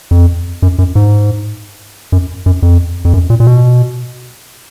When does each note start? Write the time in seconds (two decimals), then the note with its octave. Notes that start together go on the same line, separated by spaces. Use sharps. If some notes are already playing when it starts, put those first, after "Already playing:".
0.11 F2
0.62 F#2
0.79 F#2
0.95 G#2
2.12 F#2
2.46 F#2
2.63 F2
3.05 F2
3.14 F#2
3.30 A#2
3.40 A#2
3.47 B2